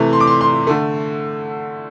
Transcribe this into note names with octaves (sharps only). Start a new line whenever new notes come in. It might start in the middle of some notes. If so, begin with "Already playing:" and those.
Already playing: C3 E3 A3
C6
D6
C6
C6
D3 A3